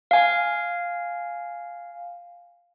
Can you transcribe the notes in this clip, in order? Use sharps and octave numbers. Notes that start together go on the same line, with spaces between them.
F5 G#5